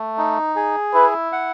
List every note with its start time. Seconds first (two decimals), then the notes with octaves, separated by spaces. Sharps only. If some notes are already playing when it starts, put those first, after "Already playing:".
Already playing: A3
0.18 D#4
0.56 G#4
0.94 E4 B4
1.32 F#5